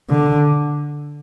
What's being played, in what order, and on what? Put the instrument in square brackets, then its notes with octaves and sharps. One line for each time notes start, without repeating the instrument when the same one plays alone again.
[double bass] D3